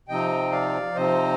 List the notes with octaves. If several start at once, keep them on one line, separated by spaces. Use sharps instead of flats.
C3 F3 C4 D#4 D#5 G5
D5 F5
C3 F3 C4 D#4 C5 D#5